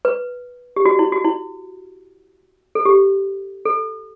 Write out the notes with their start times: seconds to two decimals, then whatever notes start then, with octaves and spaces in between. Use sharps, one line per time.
0.05 B4
0.76 G4
0.85 F#4
0.99 E4
1.12 F#4
1.25 E4
2.75 A4
2.85 G4
3.65 A4